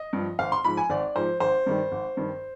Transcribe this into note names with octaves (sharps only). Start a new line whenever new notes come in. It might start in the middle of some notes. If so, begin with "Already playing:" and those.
Already playing: D#5
G2 F3
G#1 F5
C6
G#2 F3 B5
G#5
G#1 D5
G#2 F3 C5
G#1 C5
G2 D#3 G3
G#1
G2 D#3 G3